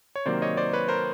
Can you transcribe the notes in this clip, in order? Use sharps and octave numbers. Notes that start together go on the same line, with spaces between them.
C#5
C3 D#3 F#3 A#3 C5 D5
C#5 D#5
C5 D5
B4 C#5
A#4 C5